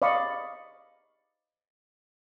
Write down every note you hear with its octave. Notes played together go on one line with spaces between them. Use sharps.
D5 D#5 F5 B5 C#6